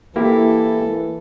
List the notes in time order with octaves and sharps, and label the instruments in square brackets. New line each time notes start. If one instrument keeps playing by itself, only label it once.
[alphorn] E3 [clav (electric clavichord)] A#3 E4 G4 [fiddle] A4